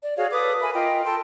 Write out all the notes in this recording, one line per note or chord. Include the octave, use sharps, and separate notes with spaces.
D5
F#4 G#4 C#5 F5
A4 B4 D6 D#6
A#4 E5 G#5 B5
F4 A#4 D#5 G5
A4 G5 A5 C6